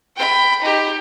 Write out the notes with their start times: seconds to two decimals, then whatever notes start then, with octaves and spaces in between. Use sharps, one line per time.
0.16 G5 B5
0.62 D#4 G4